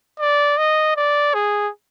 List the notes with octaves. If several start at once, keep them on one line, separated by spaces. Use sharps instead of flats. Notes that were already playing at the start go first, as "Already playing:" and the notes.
D5
D#5
D5
G#4